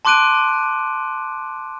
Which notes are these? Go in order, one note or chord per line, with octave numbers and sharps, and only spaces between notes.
A5 C6 D6 F#6 D7 D#7